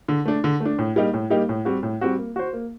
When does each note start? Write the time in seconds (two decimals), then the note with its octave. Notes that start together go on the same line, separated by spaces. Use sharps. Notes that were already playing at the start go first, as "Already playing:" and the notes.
0.08 D3
0.25 A3 D4
0.44 D3
0.60 A3 D4
0.79 A2
0.96 G3 A#3 D#4 G4
1.14 A2
1.30 G3 A#3 D#4 G4
1.49 A2
1.65 G3 C4 F#4
1.83 A2
2.01 G3 C4 F#4
2.18 A#3
2.36 F#4 C5
2.53 A#3